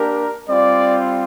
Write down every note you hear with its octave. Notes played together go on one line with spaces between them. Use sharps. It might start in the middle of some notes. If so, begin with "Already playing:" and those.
Already playing: A#3 D4 G4 A#4
G3 C4 F4 D5